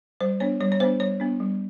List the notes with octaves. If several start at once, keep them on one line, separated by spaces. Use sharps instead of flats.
G3 C5
B3 D4 C#5
G3 C#5
C#5
B3 D4 C5
G3 C#5
B3 D4
G3